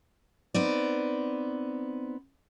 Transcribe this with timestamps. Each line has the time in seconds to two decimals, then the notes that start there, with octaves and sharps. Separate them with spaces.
0.54 B3 C4 D#4 D5